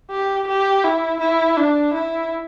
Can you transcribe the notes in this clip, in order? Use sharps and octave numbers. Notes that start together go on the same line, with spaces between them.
G4
G4
E4
E4
D4
E4